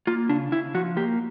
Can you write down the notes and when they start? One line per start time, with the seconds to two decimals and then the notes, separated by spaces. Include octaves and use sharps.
0.07 A#3 F4
0.29 C#3 D4
0.52 C#3 E4
0.75 F3 F#4
0.97 A#3 G4